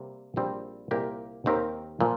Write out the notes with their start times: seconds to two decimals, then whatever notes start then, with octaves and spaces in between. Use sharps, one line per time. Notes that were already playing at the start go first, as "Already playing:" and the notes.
Already playing: C3 G3 A#3
0.36 A#1 A#2 G3 C4
0.91 C2 A#2 A#3 G4 A#4
1.46 D#2 D#3 C4 G4 A#4
2.01 A#2 F3